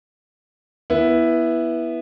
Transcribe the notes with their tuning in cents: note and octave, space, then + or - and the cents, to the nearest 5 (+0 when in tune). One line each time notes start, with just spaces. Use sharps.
E3 +0 B3 -15 E4 +0